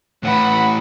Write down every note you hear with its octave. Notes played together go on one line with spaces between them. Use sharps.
A2 E3 F#5 B5